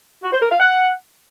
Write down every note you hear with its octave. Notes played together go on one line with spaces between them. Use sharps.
F#4
C5
A#4
F5
F#5